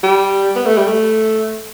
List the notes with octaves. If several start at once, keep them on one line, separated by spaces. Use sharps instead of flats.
G3
B3
A3
G3
A3